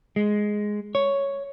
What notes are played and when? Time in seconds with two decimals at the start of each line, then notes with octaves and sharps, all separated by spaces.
0.16 G#3
0.95 C#5